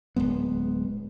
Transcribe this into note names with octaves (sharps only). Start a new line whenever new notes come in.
D1 G#2 G#3 B3